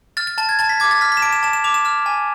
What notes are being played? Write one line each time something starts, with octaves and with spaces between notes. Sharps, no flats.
F6 A6
A6
A5 A6
G#6
A5 A6
B6
D6 G#6
A6
F6 B6
B6
E7
A5 D7
E7
A5 E7
E7
D6 F7
E7
F6 E7
G#5